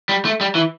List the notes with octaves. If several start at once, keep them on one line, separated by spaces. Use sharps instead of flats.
G3
A3
G3
E3